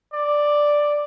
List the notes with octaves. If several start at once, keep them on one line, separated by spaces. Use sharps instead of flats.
D5